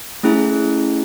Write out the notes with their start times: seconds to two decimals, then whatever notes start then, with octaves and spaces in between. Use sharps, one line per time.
0.23 A3 C#4 E4 G#4